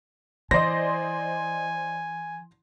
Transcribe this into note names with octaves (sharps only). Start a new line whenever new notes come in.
E3 C5 D5 D#5 G#5 C6 A#6